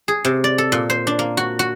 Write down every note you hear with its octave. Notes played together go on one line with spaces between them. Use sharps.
G#4
C3
D5
A4
A#2
C5
D4
A#3
F#4
F#4